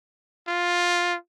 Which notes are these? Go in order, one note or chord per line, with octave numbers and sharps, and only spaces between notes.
F4